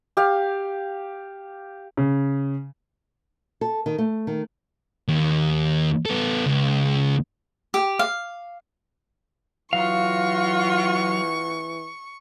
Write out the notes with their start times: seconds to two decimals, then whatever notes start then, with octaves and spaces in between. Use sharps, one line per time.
0.17 G4 F5
1.97 C#3
3.61 A4
3.86 D#3
3.98 A3
4.27 D#3
5.08 D#2
6.06 B3 A4
6.46 C#2
7.74 G4
7.99 F5
9.73 E3 F#3 F4 F#4 F5 C#6